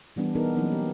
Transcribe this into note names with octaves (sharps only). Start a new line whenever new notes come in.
E3 G3 B3 D4
E3 B3 D#4 G#4 A#4
E3 F#3 A#3 C#4 D#4
G4